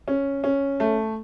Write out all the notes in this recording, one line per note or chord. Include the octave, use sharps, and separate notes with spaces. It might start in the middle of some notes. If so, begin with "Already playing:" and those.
C#4
C#4
A3